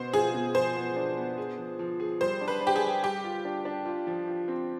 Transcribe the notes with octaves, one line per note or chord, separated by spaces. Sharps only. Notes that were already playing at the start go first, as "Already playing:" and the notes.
Already playing: B2 B3 C5
F4 G#4
B2
F3 C5
B3
D4
B3
G#4
F3
F3
G#4
G3 C5
D4
B4
D4
G4
G#4
G3
G3 G4
F4
D4
D4
F4
F3
F4
C4